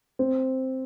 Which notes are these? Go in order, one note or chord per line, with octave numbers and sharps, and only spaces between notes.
C4